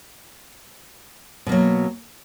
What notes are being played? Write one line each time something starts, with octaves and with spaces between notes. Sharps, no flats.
B2 F#3 A#3